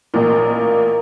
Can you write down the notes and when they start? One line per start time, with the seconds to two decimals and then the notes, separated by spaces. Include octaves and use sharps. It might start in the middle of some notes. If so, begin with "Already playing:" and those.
0.14 A1 A#2 A#4
0.51 A#3